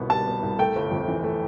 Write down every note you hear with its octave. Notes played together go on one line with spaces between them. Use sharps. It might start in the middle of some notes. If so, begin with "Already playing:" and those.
Already playing: G1 C2 B2 B3
G3 A5
B3
C2
A3 G5
G1
F2
E3
A3